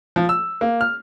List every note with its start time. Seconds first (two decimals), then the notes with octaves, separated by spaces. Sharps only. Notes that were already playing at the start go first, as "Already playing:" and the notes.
0.16 F3
0.29 E6
0.61 A#3
0.81 F6